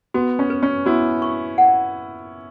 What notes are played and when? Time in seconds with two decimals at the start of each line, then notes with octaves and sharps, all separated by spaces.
0.14 B3 F#4
0.39 C#4
0.50 B4
0.63 C#4
0.86 B3 E4 F#4
1.22 C#6
1.58 F#5